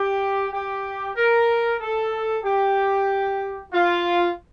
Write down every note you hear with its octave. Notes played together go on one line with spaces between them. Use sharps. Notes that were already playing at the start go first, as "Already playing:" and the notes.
Already playing: G4
G4
A#4
A4
G4
F4